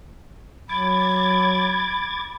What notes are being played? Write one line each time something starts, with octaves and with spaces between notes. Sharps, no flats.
F#3 B5 D6 G#6 A6